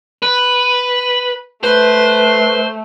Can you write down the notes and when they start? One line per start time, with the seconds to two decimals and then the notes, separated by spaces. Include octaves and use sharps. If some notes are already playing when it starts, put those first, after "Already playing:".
0.22 B4
1.64 A3 B4 C5